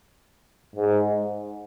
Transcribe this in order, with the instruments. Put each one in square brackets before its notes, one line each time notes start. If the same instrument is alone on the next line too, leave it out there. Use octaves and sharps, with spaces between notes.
[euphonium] G#2